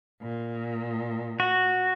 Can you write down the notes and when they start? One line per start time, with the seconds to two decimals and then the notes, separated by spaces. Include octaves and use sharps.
0.21 A#2
1.40 F#4